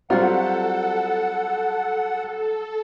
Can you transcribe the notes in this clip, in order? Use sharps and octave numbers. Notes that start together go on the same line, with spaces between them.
F#3 G3 C4 F4 F#4 A4 F#5